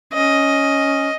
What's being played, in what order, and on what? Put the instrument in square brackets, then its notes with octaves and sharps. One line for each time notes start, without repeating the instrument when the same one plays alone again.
[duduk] C#4 [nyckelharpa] D#5